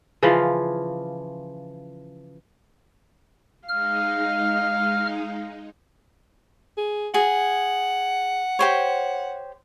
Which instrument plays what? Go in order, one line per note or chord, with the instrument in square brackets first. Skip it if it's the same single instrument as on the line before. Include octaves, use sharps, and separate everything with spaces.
[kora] C#3 E3 F3 F4
[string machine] G#3 D#4 [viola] F5 [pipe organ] F6
[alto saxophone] G#4
[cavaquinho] G#4 [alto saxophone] F#5
[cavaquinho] G4 C5 C#5